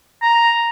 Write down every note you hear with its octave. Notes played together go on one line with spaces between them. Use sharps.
A#5